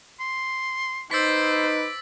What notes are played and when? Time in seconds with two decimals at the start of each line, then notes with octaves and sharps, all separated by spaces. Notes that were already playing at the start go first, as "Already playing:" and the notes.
0.20 C6
1.11 D#4 B4 C5 D6 E6 A6 B6